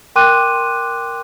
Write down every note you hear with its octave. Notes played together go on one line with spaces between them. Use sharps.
A#4 G5 C6 D6 F#6 D#7